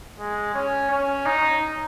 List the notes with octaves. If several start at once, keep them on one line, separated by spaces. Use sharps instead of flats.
G#3
C#4
C#4
D#4